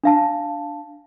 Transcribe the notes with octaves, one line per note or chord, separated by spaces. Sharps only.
D4 F5 A5